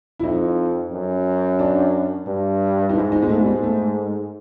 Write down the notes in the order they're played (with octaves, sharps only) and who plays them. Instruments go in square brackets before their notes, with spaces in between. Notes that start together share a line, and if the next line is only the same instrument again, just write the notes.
[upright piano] E4
[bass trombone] F2 [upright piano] D#4
[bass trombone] F#2
[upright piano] D4
[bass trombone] G2
[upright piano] D#4
[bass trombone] G#2 [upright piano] E4
[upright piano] D#4
G#3
[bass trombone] G#2 [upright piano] A3
[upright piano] G3
G#3
A3